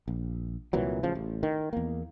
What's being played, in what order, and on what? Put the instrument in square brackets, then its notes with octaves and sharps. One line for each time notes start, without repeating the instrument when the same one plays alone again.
[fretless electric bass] A#1
C2 A#2 E3 F#3
A1 C#3 F3
A1
D#3
E2 A#3